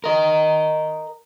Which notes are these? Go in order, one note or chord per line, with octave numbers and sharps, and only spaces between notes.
A#4 D#5